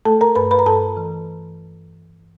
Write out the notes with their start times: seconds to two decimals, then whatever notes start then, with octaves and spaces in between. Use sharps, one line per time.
0.05 A3 A4 A5
0.21 A#4 A#5
0.35 G2 B4 B5
0.51 B4 B5
0.59 A#5
0.66 G2 A4 A5
0.97 E3